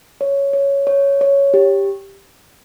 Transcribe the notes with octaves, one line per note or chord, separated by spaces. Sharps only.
C#5
C#5
C#5
C#5
G4